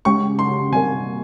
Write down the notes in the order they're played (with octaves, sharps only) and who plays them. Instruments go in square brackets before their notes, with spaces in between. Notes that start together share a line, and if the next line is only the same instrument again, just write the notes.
[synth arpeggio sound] C#3 G#3 C#4 G4 [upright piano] C#6
[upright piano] C6
[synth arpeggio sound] C3 G3 A#3 [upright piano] G#5